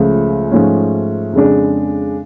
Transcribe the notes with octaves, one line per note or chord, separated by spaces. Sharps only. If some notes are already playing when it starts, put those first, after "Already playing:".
Already playing: C#2 C#3 F3 A3
G#2 F3 A3 C#4
F2 C#3 G#3 D4